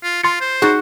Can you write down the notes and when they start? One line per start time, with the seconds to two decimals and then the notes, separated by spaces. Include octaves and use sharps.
0.03 F4
0.24 F4 C6 A6 C#7
0.41 C5
0.62 D#4 F#4 G#4